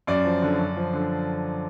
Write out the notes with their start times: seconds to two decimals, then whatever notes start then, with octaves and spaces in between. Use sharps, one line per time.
0.07 F#2 D5
0.25 F3
0.42 D3
0.58 F#2
0.76 F3
0.93 D3